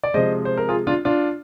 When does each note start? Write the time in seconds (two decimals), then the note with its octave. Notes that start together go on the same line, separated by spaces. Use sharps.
0.03 D5
0.14 C3 F3 G#3 C5 D#5
0.45 C5
0.57 A#4
0.69 F4 G#4
0.87 D4 F4
1.05 D4 F4